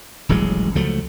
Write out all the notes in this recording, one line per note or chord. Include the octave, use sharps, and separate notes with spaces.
D#1 A1 F#3 G#3
C#2 F3 F#3 A3